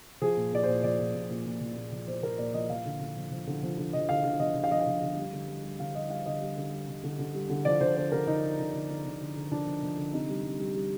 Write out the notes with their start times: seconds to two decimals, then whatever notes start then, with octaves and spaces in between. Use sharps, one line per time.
0.22 F3 G#4
0.37 A#2
0.53 A#2 D5
0.63 A#2 C5
0.84 F3 D5
0.99 A#2
1.15 A#2
1.30 A#2
1.46 A#2
1.61 F3
1.77 A#2
1.92 F3
2.07 F3 C5
2.23 F3 A#4
2.38 A#2 D5
2.54 F3 D#5
2.70 F3 F5
2.85 D3
3.00 D3
3.16 F3
3.31 F3
3.47 D3
3.63 F3
3.78 D3
3.93 F3 D#5
4.09 D3 F5
4.24 D3 F5
4.40 F3 D#5
4.55 F3
4.64 F5
4.71 F3 D#5
4.80 F5
4.87 F3
5.02 D3
5.17 G3
5.33 D3
5.48 G3
5.64 G3
5.79 D3 F5
5.95 G3 D#5
6.10 G3 F5
6.26 D3 D#5
6.41 G3
6.57 D3
6.72 G3
6.88 D3
7.04 D3
7.19 D3
7.34 G3
7.50 D3
7.65 F3 D5
7.81 D3 C5
7.96 D3 C5
8.12 D3 A#4
8.27 D3 D#4
8.43 D3
8.59 D3
8.74 D3
8.90 D3
9.05 D3
9.21 D3
9.36 D3
9.51 F3 D4
9.67 F3
9.83 F3
9.98 D3
10.13 C3 D#4
10.29 G3
10.45 G3
10.59 G3
10.75 G3